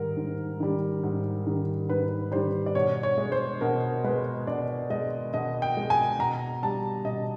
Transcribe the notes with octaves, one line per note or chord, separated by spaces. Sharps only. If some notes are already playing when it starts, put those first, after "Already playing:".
Already playing: G#2 D#3 G3 A#4
G#2
D#3 G3
G#2
D#3 G3
G#2 B4
D#3 G3 C5
D5
B2 C#5
C#5
G#3
C5
B2 A#4
G#3 B4
B2 D5
G#3 D#5
B2 D#5
G5
G#3
G#5
B2 A#5
G3 A5
B2 D#5